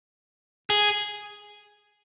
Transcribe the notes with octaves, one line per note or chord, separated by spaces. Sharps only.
G#4